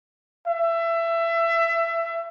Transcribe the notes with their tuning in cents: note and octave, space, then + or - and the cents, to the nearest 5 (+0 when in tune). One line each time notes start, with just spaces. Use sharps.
E5 +25